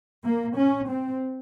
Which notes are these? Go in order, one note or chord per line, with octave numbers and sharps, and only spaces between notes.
A#3
C#4
C4